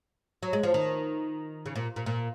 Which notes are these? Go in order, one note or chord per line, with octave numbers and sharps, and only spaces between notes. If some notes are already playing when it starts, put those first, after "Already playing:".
F#3
G#3
F3
D#3
C#3
A#2
A#2
A#2